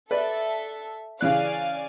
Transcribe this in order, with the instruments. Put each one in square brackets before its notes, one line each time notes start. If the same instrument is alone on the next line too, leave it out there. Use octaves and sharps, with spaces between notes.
[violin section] A4 E5 [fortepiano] B4 D5
[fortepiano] C#3 E3 F#6 [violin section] D5 F5 G#5